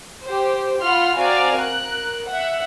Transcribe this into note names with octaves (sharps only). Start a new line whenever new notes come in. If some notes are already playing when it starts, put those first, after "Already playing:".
G4 C5
F4 F#5 B5 C6 F6
C4 F#4 D5 F5 G#5 A#5
A#4 F#6
E5 F#5